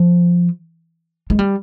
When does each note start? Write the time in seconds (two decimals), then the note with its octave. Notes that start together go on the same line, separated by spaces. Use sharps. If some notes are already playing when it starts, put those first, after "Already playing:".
Already playing: F3
1.30 G#3
1.39 G3